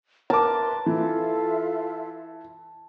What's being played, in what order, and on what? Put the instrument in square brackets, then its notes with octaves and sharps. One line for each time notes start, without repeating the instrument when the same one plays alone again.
[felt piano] A#4 D6 [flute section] B4 E5 C6 [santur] A5
[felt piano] E3 [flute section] F4 A4 E5